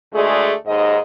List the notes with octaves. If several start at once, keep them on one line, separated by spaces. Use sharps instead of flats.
D2 G#3 A3 G#4 D5
D#2 G#2 D#5